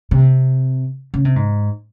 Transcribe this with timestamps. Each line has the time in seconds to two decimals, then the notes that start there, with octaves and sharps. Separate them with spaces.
0.11 C3
1.14 C#3
1.25 C3
1.36 G#2